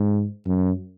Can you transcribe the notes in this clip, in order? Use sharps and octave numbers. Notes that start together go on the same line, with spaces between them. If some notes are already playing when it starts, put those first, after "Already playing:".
Already playing: G#2
F#2